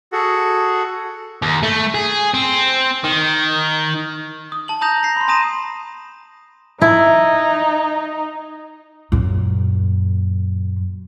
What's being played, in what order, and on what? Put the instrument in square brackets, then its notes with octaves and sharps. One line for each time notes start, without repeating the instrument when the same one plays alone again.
[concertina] F#4 G#4 A4 F#5
[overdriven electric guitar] D#2
A3
G#4
C4
D#3
[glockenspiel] D#6
A5 F#7
A5 A#5 D#6 G6 A#6 F7
A#6 C7
B5 C6
G#5 A#5 D#6 A#6 D#7 E7
[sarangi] D#4 [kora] E4
[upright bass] F#2 A#2